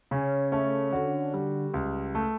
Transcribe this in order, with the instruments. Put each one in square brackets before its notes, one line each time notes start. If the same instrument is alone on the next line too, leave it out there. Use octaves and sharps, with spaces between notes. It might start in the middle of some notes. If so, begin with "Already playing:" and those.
[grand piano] C#3 [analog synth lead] C#4
[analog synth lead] A3 [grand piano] C#4
[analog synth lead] D3 [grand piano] F#4
[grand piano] G3
C#2
A3